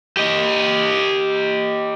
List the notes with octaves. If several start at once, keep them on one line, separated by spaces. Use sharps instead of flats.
G4 D#5